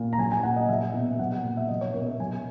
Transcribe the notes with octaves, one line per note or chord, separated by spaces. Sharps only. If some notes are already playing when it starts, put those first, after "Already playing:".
Already playing: A#2
A#5
F#3 G#5
G#5
A#2 F#5
D#5
F#3 E5
B2
F#3 F#5
F#5
A#2
E5
F#3 D#5
C#5
B2 A#4
E5
F#3 G#5